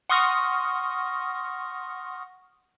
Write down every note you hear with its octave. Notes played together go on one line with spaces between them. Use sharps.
F#5 C6 C#6 D#6 F6 A#6